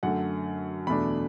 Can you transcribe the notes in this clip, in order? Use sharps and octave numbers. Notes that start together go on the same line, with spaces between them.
F#2 D3 A3 F#5
E2 B2 A3 D4 B5